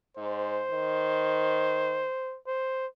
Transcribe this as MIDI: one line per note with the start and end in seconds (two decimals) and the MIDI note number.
0.17 0.62 44
0.17 2.37 72
0.71 2.05 51
2.47 2.87 72